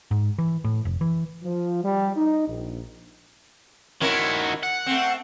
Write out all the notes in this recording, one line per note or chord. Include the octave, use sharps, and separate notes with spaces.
G#2
E3
A2
F1
E3
F3
G3
D#4
A#1
D#3 C#4 E4 F#4 A#4
F#5
A3 C4